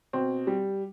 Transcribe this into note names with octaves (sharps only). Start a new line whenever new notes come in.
B2 C4
G3